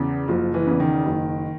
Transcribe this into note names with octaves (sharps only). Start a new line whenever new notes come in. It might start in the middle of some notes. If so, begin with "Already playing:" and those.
Already playing: E2 C#3
F#1 F3
E3
E2 C#3
D#3
F#1